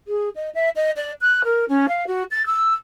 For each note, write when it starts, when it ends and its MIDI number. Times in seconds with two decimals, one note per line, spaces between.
0.07 0.29 68
0.35 0.49 75
0.54 0.69 76
0.75 0.90 75
0.96 1.11 74
1.21 1.41 90
1.44 1.64 70
1.68 1.86 61
1.88 2.04 77
2.07 2.23 66
2.31 2.45 93
2.46 2.73 88